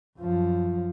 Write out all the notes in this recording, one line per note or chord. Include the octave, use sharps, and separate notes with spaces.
F#2 F3